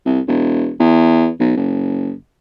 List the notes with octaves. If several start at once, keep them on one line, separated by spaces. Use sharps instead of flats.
C2
E1
E2
B1
F#1